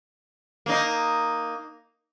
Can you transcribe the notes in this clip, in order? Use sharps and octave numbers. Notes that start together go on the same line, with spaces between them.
A#3 D#4